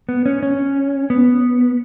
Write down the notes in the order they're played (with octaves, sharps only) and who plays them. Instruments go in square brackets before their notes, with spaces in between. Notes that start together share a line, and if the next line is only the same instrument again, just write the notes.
[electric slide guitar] B3
C#4
C#4
B3